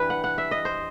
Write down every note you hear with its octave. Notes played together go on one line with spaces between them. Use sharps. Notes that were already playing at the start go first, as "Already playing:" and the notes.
Already playing: G2 E3 G3 B4
F#5
F#5
E5
D#5
C5